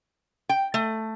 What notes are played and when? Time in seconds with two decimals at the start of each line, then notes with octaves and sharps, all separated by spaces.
0.49 G5
0.74 A3